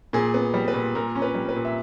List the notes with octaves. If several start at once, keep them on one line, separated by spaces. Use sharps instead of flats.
A#2 G#4
B3
G3
B4
A#2
A#2 A#4
C#4
B4
G3
B4
A#2
E5